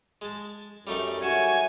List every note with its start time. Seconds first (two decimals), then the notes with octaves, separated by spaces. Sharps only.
0.22 G#3 A5
0.87 F#2 G3 A3 D#4
1.23 F#4 C#5 E5 G#5